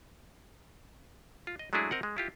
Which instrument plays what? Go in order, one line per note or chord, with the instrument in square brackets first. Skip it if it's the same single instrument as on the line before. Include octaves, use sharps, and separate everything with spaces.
[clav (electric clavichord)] F4
D#5
F#3 G#3 A3 D4 E4 G#4
C4 A#4 D#5 F#5
G#3
E4 F4 G4